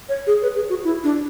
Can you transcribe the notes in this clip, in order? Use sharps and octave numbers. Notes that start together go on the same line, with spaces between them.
C#5
G#4
B4
G#4
F#4
E4
D4